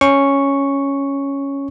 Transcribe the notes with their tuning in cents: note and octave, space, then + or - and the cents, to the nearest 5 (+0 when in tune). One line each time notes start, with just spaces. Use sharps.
C#4 +0 C#6 +0